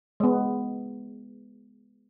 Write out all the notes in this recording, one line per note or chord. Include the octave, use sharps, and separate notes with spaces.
G#3 B3